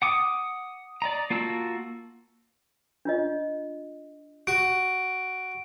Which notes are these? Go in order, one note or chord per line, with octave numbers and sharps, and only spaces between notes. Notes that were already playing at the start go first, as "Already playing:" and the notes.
F#5 D6 D#6
D5 D#5 A#5
A#3 F4 F#4 A5 E6
D4 F4 D#5
F#4 D7